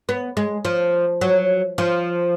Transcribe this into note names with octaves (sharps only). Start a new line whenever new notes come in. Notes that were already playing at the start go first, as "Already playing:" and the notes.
B3
G#3
F3
F#3
F3